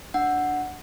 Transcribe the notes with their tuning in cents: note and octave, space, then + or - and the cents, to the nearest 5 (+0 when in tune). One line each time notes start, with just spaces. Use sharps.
D4 +0 F#5 +0